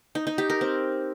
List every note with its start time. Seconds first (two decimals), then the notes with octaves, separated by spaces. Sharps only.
0.15 D#4
0.27 D#4
0.38 G4
0.50 A#4
0.61 C4